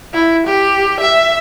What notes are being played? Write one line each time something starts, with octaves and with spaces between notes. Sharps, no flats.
E4
G4
E5